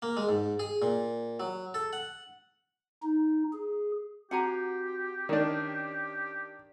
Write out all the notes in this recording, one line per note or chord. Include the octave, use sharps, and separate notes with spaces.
A#3
G#3
G#2
G#4
A#2
F#3
A4
F#5
D#4
G#4
C4 F#4 G4 F#5 G#5 A#5
D#3 C#4 D4 D5